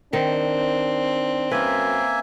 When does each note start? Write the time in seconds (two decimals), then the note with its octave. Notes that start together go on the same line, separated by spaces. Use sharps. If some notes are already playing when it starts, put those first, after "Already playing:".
0.13 D#3 C4 D4
1.51 F#2 A#3 C#4 B4 E5 G#5